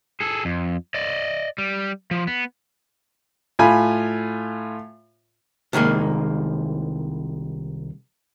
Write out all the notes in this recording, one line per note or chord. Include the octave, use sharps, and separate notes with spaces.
G#4 A4
F2
D5 D#5
G3
F3
B3
A2 F4 G#5 B5
C2 D#3 G#3 A#3